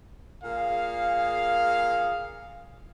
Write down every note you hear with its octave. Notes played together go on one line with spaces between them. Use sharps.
A#2 G#4 F5